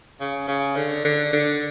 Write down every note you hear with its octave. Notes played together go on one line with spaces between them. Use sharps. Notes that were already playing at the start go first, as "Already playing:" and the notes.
C#3
C#3
D3
D3
D3